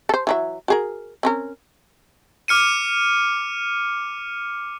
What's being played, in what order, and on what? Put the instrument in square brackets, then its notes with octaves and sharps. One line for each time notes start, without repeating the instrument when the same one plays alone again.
[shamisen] A4 C5
E3 F#3 E5
F#4 G#4 A#4
C4 C#4 A#4
[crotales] D6 F6 C#7 D#7